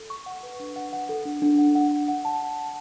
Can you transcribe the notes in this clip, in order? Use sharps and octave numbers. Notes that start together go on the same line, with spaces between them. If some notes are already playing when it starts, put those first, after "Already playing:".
Already playing: A4
C#6
F#5
B4
D4
F#5
F#5
A4
D4
D4
F#5
F#5
F#5
F#5
A5